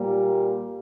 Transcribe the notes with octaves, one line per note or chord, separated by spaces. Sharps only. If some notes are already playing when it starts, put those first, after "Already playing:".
Already playing: A#2 G3 A#3